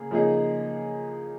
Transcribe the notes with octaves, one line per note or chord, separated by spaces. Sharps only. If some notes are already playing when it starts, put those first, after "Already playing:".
Already playing: C#3 A#3 G#4
C#3 F3 A#3 D#4 G#4